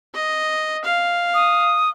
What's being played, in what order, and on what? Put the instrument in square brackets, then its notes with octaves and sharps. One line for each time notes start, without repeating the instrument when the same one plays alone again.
[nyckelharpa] D#5
F5
[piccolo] D#6